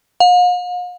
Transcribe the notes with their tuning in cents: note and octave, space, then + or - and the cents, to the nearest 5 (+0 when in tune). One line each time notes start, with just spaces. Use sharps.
F5 +45